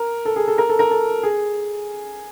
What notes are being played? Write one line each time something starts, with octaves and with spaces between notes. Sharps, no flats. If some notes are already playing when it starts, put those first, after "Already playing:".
Already playing: A#4
A4
G#4
A4
A#4
A4
A#4
A4
G#4